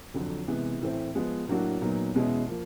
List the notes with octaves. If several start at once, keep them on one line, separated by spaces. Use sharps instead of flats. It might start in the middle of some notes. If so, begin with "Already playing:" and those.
F2 D3 F#3
C3 E3 G#3 B3
A2 E3 A3 C4
F3 G#3 B3
A2 F#3 A#3 D4 F#4
A#2 F#3 B3 D#4
E2 B2 G#3 C#4 E4
F3 A#3